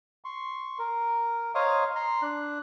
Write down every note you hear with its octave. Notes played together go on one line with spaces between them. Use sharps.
C6 C#6
A#4
C5 C#5 D#5 F5 A#5 D#6
A#5 C6
D4 F#6